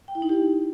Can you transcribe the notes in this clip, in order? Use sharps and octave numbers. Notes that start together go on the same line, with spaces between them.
G5
E4
D#4
G4